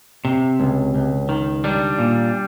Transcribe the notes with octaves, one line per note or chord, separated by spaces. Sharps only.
C3
C#2
C#2
D#3
G3 D4
A#2